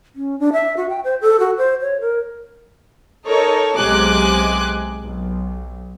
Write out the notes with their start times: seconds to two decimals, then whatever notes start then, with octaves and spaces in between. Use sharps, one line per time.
0.16 C#4
0.40 D4
0.53 E5
0.77 F#4
0.90 G5
1.04 C5
1.21 A4
1.40 F#4
1.58 C5
1.81 C#5
2.01 A#4
3.25 D#4 A4 A#4 C#5
3.77 B1 C3 G#3 G#5 D6 F#6
5.00 B1